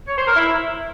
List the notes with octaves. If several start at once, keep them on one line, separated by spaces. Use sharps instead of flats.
C#5
C5
A#4
E4